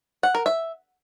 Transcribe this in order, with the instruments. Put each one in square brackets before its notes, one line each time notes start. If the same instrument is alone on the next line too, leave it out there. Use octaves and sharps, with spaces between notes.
[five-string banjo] F#5
A#4
E5